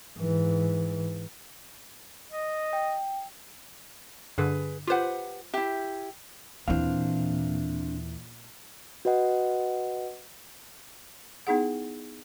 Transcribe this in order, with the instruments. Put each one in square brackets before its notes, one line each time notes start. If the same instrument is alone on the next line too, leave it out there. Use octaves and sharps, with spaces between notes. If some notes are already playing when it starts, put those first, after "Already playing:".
[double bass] G#2 E3
[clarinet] D#5
[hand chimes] G5
[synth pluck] G2 D3 [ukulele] G#4 B4
[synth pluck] F4 C5 [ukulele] G4 B4 F#5
[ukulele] E4 G4 [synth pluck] E5
[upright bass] D#2 E3 [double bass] A#2 [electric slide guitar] C4 D4 F5
[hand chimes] F#4 B4 D#5 F#5
[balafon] B3 D#4 E4 G#4 F#5